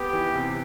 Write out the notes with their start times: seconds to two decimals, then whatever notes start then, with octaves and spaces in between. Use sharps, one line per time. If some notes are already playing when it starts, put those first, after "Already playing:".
Already playing: B3 G4
0.13 E3
0.35 C3